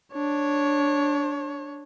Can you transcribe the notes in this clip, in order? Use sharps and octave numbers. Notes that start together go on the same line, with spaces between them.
D4 C#5